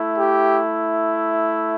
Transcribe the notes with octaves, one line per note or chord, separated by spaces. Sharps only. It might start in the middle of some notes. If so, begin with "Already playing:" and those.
Already playing: A3 E4
G4